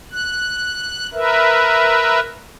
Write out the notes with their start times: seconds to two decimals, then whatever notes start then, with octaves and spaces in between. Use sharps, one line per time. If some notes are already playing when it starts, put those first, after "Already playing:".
0.11 F#6
1.13 A#4 B4 E5